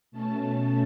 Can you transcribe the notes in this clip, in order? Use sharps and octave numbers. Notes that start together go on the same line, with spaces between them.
B2 A3 C#4 A5